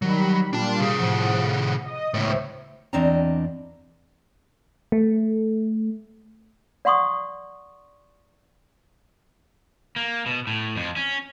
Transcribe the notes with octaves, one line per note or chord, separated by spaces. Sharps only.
D#3 F#3 G3 B5
A#2 G3 D4 F4 A5
C3 G#4
A2 F3 F#5
D#5 D#6
C#2 A2 C5 C#5 E5
E2 C4 D4 D5 D#5 A#5
A3
D5 F#5 C6 C#6 D#6
A#3
B2
A2
F2
C#4